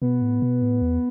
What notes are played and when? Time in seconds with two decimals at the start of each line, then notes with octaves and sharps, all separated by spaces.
0.01 B2 B3
0.22 A2
0.42 B2
0.62 A2
0.82 E2